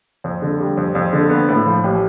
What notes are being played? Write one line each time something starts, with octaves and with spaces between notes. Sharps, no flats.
F2
D3
G3
F2
F2
D3
B3
A2
F3
A1